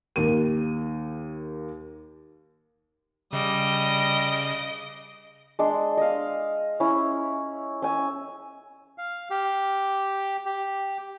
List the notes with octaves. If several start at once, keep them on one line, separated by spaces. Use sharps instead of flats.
D#2 A#3 D#7
C#3 G3 D#5 D7
G#3 D4 C6
D#5 F5
C#4 E4
C#4 G#5 E6
F5
G4
G4